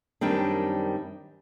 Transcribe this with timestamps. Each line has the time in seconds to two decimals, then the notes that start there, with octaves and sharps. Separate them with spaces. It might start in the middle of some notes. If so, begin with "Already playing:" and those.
0.21 F#2 D#3 G3 C4 D4